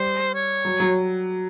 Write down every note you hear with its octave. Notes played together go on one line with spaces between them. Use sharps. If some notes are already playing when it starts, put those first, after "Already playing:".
Already playing: G3 C5
C#5
F#3
F#3